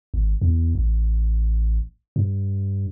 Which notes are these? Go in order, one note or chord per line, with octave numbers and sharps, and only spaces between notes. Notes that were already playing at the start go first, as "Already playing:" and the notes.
G#1
E2
A1
G2